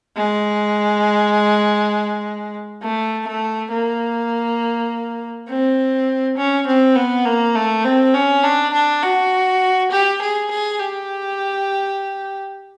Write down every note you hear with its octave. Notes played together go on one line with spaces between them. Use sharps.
G#3
A3
A3
A#3
C4
C#4
C4
B3
A#3
A3
C4
C#4
D4
D4
F#4
G4
G#4
G#4
G4